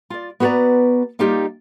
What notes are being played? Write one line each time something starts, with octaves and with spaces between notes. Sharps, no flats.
F4 D5
B3 F#4 B4 C5 D5 A#5
G3 A#3 D#4 F4 G4